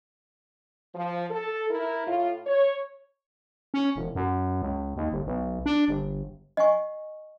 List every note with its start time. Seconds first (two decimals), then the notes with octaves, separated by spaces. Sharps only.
0.94 F3
1.29 A4
1.69 E4 A#4
2.06 A2 F4
2.46 C#5
3.74 C#4
3.96 E1
4.15 F#2
4.62 C#2
4.96 D#2
5.12 G1
5.26 B1
5.66 D4
5.88 G1
6.57 D#5 F#5 G#5 C#6